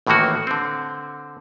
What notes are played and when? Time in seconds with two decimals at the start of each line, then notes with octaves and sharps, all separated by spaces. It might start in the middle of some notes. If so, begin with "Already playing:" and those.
0.07 A1 A2 D#3 E3 A#3 F#4
0.47 D3 C4